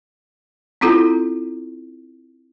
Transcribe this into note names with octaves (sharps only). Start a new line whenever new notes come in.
C4 C#4 E4 F4 A4